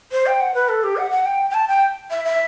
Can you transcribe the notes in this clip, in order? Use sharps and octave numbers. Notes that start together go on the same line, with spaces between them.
C5
G5
F#5
B4
A4
G4
F#5
F#5
G5
G5
A5
G5
E5
E5